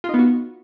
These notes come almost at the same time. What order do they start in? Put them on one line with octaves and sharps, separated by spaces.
F4 D#4 B3 F#4